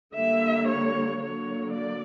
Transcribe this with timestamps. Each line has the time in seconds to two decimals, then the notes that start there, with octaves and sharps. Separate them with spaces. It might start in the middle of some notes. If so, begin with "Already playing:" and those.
0.15 D3 G3 A#3 E5
0.68 C#5
1.20 D3 F#3 A#3 C#5
1.73 D5